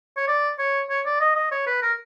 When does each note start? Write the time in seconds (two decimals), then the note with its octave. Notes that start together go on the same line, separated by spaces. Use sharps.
0.17 C#5
0.28 D5
0.59 C#5
0.90 C#5
1.06 D5
1.20 D#5
1.36 D#5
1.51 C#5
1.67 B4
1.82 A#4